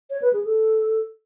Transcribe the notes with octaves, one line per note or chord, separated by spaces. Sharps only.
C#5
B4
G#4
A4